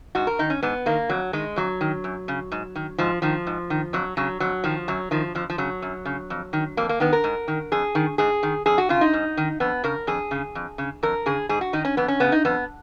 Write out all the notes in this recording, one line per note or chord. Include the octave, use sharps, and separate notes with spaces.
G#2 F#4
A#4
D#3 D#4
C#4
G#2 B3
D#3 A#3
F2 F#3
D#3 G#3
F2 F#3
D#3
F#2
C#3
G#2
D#3
G#2 F3
D#3 F3
G#2
D#3
F2 F#3
C#3 F#3
F2 F#3
D#3 F3
F#2 F#3
D#3 F3
F2 F3
F3
C#3 F#3
F#2
C#3
F2
D#3
F2 A#3
A#3
D#3 B3
A#4
G#2
D#3
F2 G#4
D#3
G#2 G#4
D#3
F2 G#4
F#4
C#3 F4
D#4
G#2
D#3
F2 B3
C#3 A#4
F2 G#4
C#3
F2
C#3
F2 A#4
C#3 G#4
G#2 G#4
F#4
D#3 D#4
C#4
F2 B3
C#4
C#3 B3
D#4
F2 B3